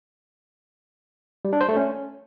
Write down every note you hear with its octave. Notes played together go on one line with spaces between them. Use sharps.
G3
D4
C5
A3
C#4